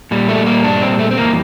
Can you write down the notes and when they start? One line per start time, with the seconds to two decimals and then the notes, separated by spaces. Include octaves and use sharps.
0.11 A#2 G3
0.29 A3
0.46 A#3
0.64 D4
0.82 C4
0.99 A3
1.11 C4
1.17 F2 E3 G3 A#3